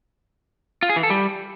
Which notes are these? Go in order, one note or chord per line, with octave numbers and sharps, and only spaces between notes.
F4
G#4
E3
A4
G3